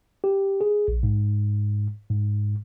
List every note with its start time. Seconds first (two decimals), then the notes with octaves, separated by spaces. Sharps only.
0.24 G4
0.61 G#4
0.88 A#1
1.03 G#2
2.10 G#2